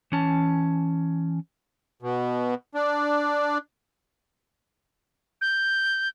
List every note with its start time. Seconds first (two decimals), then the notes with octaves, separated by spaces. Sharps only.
0.12 E3 C#4 A5
2.02 B2
2.75 D4
5.41 G6